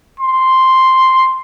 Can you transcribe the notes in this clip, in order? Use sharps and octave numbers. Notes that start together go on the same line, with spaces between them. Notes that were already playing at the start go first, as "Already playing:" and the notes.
C6